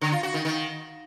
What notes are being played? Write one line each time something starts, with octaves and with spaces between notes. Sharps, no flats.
D3
F4
F#4
D#3
D#3